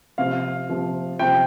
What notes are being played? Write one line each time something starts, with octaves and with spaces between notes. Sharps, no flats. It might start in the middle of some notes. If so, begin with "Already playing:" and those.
C3 F3 F5
C3 F3
C3 F3 G5